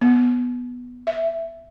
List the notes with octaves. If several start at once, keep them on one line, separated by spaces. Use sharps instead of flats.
B3
E5